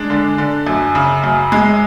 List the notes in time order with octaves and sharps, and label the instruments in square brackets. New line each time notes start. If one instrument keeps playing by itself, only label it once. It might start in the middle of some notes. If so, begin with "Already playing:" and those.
Already playing: [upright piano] G#3 D4
D3
D3
F#2
C#3
F#2
G#3